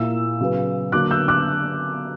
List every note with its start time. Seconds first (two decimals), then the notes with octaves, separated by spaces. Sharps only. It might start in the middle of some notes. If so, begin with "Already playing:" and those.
Already playing: A#2 A#3 E4 E6
0.40 C#3 F#3 B3
0.92 D3 F#3 A#3 D4 D6 F#6
1.11 E6 G6
1.28 D6 F#6